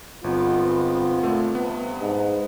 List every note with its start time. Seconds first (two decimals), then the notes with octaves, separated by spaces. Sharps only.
0.24 G1 G#3 B3 C4 F4
1.23 A#2 A3
1.55 G2 C3 B3
2.01 G#2